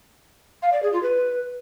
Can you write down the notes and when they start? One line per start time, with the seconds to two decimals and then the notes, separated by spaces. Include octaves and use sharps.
0.62 F5
0.73 D5
0.83 G#4
0.93 F4
1.03 B4